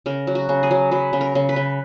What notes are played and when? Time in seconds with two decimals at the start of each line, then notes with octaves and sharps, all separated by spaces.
0.06 C#3 A#4
0.27 F#3
0.35 F#4
0.49 C#3
0.63 G#4
0.71 F#3
0.92 F#3 B4
1.13 C#3
1.21 A#4
1.35 C#3
1.49 B4
1.56 C#3